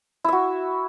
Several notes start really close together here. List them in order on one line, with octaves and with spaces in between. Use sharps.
E4 E5 F#4